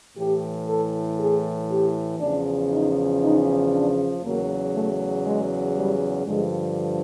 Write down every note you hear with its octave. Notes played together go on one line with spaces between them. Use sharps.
A2 E3 G4
A4
G#4
G4
E2 C#3 F3 D4
D#4
D#4
D4
E2 C#3 F#3 A#3
A3
G#3
G3
G2 D3 F3 G#3